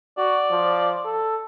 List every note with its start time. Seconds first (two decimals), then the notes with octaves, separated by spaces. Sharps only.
0.18 F#4 D5
0.51 F3
1.05 A4